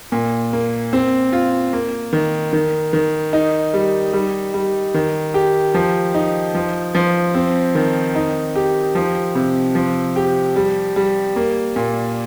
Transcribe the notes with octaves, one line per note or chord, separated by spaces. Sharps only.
A#2
A#3
C4
F4
A#3
D#3
D#3
D#3
D#4
G3
G3
G3
D#3
G4
F3
D#4
F3
F3
C4
D#3
D#4
G4
F3
C3
F3
G4
G3
G3
A#3
A#2